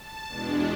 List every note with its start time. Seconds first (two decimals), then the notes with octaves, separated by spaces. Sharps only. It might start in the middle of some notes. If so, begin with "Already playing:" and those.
Already playing: A5
0.28 E2 B2 G#3 D4